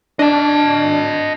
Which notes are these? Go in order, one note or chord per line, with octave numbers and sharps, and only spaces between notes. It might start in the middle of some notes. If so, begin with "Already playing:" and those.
D4 D#5 A5